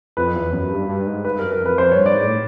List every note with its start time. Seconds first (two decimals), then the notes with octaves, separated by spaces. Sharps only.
0.17 F2 B4
0.35 E2
0.53 F#2
0.71 G2
0.89 G2
1.07 G#2
1.25 G2 B4
1.35 G2
1.39 A#4
1.43 F#2
1.51 A#4
1.60 F2
1.66 B4
1.78 F2 C5
1.92 G2 C#5
2.06 D5
2.14 G#2
2.25 A2